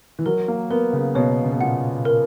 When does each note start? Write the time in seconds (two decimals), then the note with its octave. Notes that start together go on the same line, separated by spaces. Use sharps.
0.19 E3
0.26 F#3 A#4
0.48 A#3
0.70 B3 A#4
0.93 C#3
1.15 B2 C#5
1.43 C#3
1.52 B2
1.61 A#2 F#5
2.05 A#4